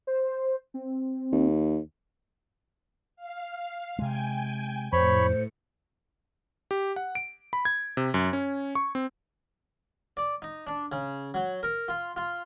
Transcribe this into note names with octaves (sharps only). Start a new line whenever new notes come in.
C5
C4
D#2
F5
C3 G#3 G5 G#5
F2 A2 C5 C#5 B5 C#7
G4
F#5
D7
B5
G#6
C3
F#2
C#4
C#6
C4
D5
D#4
D4
C#3
F#3
A#4
F4
F4